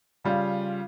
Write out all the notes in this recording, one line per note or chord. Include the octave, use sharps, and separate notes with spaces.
C#3 G3 F4